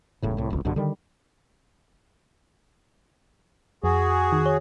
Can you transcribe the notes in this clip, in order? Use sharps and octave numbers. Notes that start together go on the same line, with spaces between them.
E1 A2 C#3
C2 A2
D#1 G#1 C#2
B1 G2 B2 D3
D3 D#3 G3
F2 F#4 G#4
D#3
C#5